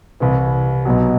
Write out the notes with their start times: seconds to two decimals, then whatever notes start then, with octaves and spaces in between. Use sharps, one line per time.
0.20 C2 C3 E3
0.85 B1 B2 F#3